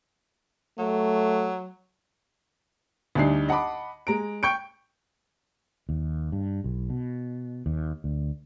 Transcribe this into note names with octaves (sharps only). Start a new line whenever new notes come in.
F#3 A3
D2 G3 D4 D#4 C7
D#5 F#5 A5 B5 D6
G#3 A#5 D7
G5 C#6 G6 C#7 D7
D#2
G2
B1
B2
D#2
D2